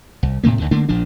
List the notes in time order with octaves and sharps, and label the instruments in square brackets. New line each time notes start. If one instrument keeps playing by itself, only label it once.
[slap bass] C2
A2 C3 A3 A#3
D2 D3 D#3
D3 A3 A#3 D4
A#1 A#2 F3 D4